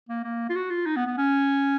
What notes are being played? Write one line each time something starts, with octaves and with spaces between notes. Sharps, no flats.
A#3
A#3
F4
F#4
F4
D#4
B3
B3
C#4